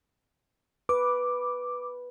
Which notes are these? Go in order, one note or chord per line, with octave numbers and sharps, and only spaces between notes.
B4 D6